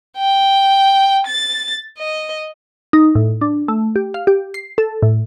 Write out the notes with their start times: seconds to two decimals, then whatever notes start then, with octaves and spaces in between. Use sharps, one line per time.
0.18 G5
1.27 A6
1.98 D#5
2.93 D#4
3.15 A2
3.41 D4
3.68 A3
3.96 G4
4.14 F5
4.27 G4
4.54 C7
4.78 A4
5.03 A2